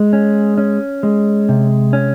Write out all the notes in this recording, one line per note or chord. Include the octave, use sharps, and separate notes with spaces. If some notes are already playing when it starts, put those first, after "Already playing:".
Already playing: G#3
C#4
C#4
G#3
C3
C#4